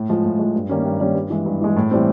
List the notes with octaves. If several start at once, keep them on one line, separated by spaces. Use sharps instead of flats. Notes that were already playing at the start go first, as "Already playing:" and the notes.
Already playing: A2
F3 G#3
A2
F3 G#3
G2
D#3 G3 A#3 C#4
G2
D#3 G3 A#3 C#4
G2
E3 G#3
G2
E3 G#3
A2
E3 G3 C4